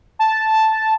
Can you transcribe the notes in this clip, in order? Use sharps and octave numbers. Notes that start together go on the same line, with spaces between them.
A5